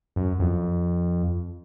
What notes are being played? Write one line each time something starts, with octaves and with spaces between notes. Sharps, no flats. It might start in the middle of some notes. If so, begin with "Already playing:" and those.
F#2
F2